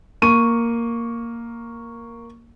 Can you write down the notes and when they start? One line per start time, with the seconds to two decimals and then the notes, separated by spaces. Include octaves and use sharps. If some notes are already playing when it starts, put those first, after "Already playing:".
0.22 A#3 C#6 D#7